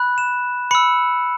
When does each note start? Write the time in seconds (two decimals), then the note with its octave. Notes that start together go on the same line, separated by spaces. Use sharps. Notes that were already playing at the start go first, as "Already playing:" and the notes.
Already playing: B5 F#6
0.18 E7
0.71 B5 E6 C#7